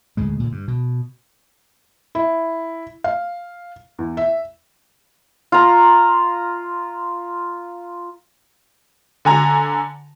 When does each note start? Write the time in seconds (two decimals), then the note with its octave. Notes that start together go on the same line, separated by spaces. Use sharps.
0.17 D2 A2 C#3 G#3
0.40 A#2 D3
0.52 G2
0.68 B2
2.15 E4
3.04 F5
3.99 E2
4.17 E5
5.52 F4 A#5
9.25 D3 G#5 A#5